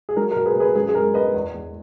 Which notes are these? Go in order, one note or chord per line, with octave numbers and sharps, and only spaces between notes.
G#4
F#3 A#4
A#4
B2
G#4 B4
B2 G#4 B4
F#2 G#4
G#4
G#3 A#4
B3 B4 D#5
E2
E2